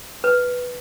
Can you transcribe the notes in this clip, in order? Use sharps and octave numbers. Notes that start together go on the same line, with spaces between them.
B4